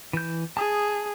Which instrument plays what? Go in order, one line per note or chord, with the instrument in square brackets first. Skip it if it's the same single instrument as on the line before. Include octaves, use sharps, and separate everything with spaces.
[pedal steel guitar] E3 G6
[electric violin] G#4 [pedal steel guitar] A5 D#6